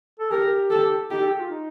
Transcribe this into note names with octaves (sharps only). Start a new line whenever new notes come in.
A4
G4 A#4
A4
D#4 G4
A4
G4
F4
D#4